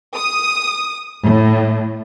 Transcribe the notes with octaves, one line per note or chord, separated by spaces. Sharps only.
D#6
A2